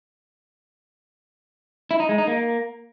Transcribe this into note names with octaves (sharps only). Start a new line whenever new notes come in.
E4
D#4
G#3
D#4
A#3